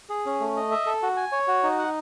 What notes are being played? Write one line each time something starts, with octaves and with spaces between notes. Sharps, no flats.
G#4
C#4
A3
D#5
E5
A4
F#4
G#5
C#5
F#4
D#4
F#5